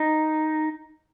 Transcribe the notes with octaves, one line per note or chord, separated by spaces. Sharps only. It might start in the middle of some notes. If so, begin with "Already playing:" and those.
Already playing: D#4